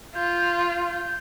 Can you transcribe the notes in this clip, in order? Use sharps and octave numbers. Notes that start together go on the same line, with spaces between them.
F4 G6